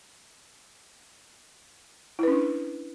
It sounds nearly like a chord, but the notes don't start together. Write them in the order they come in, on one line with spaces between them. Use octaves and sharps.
E4 B4 C#4 D4